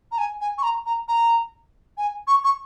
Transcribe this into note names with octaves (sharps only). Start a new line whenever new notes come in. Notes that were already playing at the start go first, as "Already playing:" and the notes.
A#5
G#5
G#5
C#6
A#5
A#5
A#5
G#5
C#6
C#6